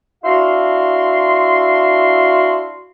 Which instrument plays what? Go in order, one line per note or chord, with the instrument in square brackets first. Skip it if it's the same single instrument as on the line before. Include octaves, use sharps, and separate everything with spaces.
[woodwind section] D4 E4 F#4 F5 C6